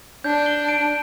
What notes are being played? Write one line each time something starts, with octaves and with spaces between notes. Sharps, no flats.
D4 G6
G7
D7